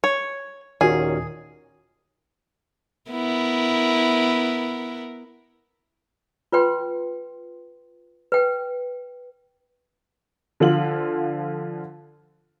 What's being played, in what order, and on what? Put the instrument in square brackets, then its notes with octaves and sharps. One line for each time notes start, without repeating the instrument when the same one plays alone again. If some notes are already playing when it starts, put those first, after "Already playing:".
[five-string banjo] C#5
[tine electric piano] D#2 A#2 C#4 [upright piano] D#3 F#4 [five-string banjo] G#4
[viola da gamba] B3 E4 A#4
[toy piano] F4 B4 G5 C6
B4 G5
[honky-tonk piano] D3 F3 F4 F#7